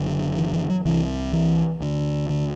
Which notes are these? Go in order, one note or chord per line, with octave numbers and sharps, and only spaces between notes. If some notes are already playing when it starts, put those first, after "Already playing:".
Already playing: F#1 F#2 D3
E3
E3
F#3
C2 C3 E3
E3
D2 D3
D3